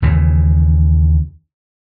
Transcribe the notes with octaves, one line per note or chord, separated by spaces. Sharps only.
D#2 C#3 E3